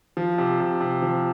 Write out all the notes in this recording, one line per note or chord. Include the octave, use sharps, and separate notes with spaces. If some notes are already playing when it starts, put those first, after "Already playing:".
F3
C3
C3
C3
F3